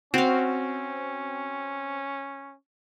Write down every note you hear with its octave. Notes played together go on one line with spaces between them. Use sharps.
C4 C#4 F#4 F5